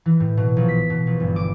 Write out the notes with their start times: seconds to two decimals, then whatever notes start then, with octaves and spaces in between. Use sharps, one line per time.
0.06 E3
0.20 A2
0.37 B2
0.57 A#1
0.68 B6
0.90 B2
1.07 A#1
1.20 G1
1.36 D6